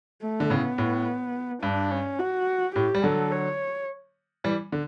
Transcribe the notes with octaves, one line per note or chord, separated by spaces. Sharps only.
A3
D3
A2 C#3 B3
A2
G2 D4
C#4
F#4
A2 G4
G3
D3 F#3 A4
C#5
E3 G3
D3